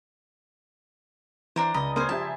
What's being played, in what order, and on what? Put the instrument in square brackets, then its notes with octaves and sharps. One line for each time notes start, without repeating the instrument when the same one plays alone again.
[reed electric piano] E3 [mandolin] D4 A#4 C5
[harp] C#2 D5 A#6 [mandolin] D#5 [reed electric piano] A#5 B5
[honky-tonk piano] A#3 G#6 [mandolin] C#4 C5 [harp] C6 D#6
[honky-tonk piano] F3 G4 E5 [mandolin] A5
[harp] G#5